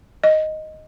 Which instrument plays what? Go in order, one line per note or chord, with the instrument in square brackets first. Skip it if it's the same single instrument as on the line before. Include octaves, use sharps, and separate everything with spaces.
[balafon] D#5